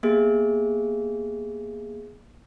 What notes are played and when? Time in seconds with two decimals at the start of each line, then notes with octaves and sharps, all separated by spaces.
0.03 A#3 B3 G4 G#4